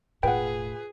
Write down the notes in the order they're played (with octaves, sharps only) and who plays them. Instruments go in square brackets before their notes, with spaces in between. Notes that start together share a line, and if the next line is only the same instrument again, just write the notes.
[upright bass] E1 A2 [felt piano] F4 B4 [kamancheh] G#4 [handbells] F#5 G5